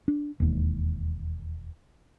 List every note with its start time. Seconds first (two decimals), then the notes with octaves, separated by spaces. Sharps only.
0.08 D4
0.40 E1 D#2